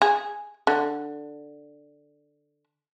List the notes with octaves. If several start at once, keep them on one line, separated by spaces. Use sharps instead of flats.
G#4
D3